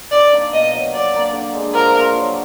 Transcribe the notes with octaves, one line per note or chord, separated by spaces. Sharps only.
D#3 D5
A#3 D4
B2 D#5
F#3 A#3
F#3 D5
A#3 D4
D3
G#3 D4
F3 A#4
A#3 F4
F#3